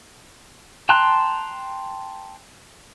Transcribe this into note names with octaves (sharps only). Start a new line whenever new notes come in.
G5 A5 A#5 C6 F#6